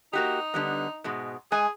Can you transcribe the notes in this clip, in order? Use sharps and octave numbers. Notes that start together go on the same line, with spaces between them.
A#3 D#4 F#4 G4
D3 G3 B3
G#2 B2 G#3
G#3 G#4 G#5